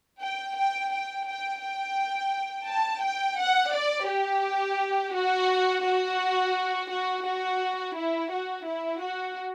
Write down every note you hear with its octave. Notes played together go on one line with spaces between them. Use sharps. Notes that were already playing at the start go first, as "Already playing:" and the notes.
G5
G5
G5
G5
G5
A5
G5
F#5
D5
G4
F#4
F#4
F#4
F#4
E4
F#4
E4
F#4